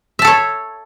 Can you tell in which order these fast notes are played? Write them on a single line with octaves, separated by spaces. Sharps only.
E5 A5 A4 C#5